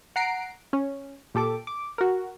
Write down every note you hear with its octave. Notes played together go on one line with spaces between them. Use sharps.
F#5 A#5 C7 D7
C#4
A#2 G4 A4 D6
D6
F#4 A#4